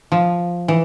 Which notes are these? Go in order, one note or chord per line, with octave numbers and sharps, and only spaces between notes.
F3
E3